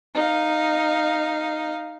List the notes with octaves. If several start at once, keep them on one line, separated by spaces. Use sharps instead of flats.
D#4 F5